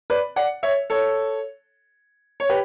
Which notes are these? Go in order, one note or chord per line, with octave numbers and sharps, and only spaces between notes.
B4 D5
D5 F#5
C#5 E5
A4 C#5
C#5
G4 B4